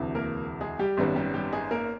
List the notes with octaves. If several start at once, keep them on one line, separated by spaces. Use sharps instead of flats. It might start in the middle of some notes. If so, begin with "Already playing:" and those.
Already playing: E1 D2 C3 E3
A#3 A#4
G#3 G#4
G3 G4
G#1 F#2 D#3 G3 B3
G3 G4
G3 G4
G#3 G#4
A#3 A#4